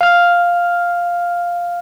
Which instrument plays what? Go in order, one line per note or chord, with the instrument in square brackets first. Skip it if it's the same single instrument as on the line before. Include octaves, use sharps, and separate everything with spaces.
[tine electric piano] F5 F6